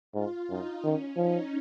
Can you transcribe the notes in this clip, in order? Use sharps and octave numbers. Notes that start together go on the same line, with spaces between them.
G#2 F4
F#2 D#4
D#3 C#4
F3 D#4